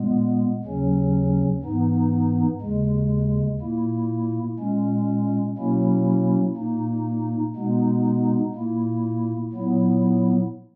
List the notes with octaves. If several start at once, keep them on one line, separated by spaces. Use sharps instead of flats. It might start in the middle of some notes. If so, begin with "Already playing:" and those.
Already playing: A#2 G#3 B3
D#2 C#3 F#3 C#4
G#2 E3 B3 D#4
D#2 C#3 G#3
A#2 A#3 E4
A#2 G#3 C#4
B2 F#3 A#3 C#4 E4
A#2 A#3 D#4
B2 G#3 B3 D#4
A#2 A#3 E4
A#2 F#3 B3 E4